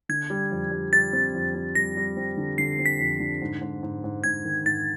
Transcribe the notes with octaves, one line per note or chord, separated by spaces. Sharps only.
D3 G#6
G3
F2
G3
G3 A6
C4
F2
C4
G3 A#6
G3
C4
D3
D3 C7
C4
B6
F2
D3
G#2
G#2
G#2
G#2
G#2 G#6
D#3
G#2 A6